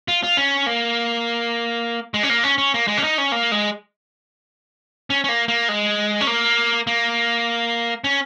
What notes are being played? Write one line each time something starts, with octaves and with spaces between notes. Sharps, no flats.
F4
F4
C#4
A#3
G#3
C#4
A#3
C#4
C#4
A#3
G#3
C#4
D#4
C#4
A#3
G#3
C#4
C#4
A#3
A#3
G#3
C#4
A#3
A#3
C#4